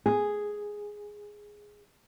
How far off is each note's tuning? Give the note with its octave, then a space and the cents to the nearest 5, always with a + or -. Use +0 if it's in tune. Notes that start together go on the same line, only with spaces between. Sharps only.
G#4 +0